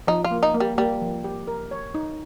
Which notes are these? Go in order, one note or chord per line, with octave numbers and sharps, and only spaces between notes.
F3 D#4
F4
A#3
D#4
A#3
G3
G3 A#3
F3
G4
A#4
C#5
D#4